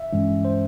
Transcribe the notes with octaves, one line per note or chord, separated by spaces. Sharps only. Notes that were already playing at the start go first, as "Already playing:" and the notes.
Already playing: E5
G2 E3 G#3 C#4
C5